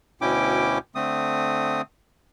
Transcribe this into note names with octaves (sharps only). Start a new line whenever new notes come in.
D2 B2 C#4 E4 G5 D6
D3 A3 C4 D#6